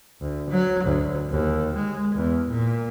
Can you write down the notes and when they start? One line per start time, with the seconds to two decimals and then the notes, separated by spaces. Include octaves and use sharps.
0.21 D2
0.50 F#3
0.84 D2
1.31 D#2
1.75 G#3
2.15 E2
2.48 A#2